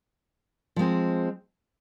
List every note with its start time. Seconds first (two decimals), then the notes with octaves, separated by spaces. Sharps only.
0.76 F3 G#3 C4